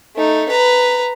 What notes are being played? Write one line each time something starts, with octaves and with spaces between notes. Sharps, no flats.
A3 D#4
B4 A#5